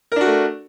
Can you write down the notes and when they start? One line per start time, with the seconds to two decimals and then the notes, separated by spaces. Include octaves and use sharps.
0.12 A#4
0.16 D4
0.21 F#4
0.25 A3